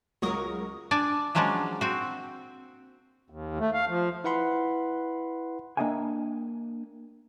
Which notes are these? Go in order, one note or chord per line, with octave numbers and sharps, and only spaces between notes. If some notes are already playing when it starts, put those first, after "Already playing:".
C#2 F#3 A#4 D#5 C#6 D#6
D4 D5 G#5
F3 F#3 G#3 A#3 C#4 D4
C4 F#4
D#2
A3
F5
F3
E4 B4 F#5 B5 C6
A#3 D4 D#5 E5 G5 G#5